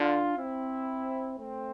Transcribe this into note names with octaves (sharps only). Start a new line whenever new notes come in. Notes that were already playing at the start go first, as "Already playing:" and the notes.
Already playing: D3 D4 F4
C4 E4
A3 C4